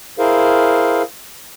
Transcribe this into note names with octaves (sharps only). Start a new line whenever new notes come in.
E4 G#4 A#4 C5 F5